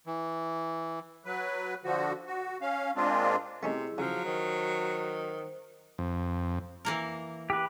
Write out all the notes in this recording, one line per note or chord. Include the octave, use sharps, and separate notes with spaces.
E3
F#3 B4
D3 F3 F#4
F#4
C#4 F5
A#2 G#3 C4 D4 F4
C3 A3 C#4 D#4 E4 G#4 E6
C#3 F3 F#3
D#3 C5
F2
E3 A#3 A#4
G4 B4